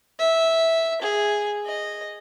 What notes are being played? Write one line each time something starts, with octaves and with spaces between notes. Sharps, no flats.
E5
G#4
D#5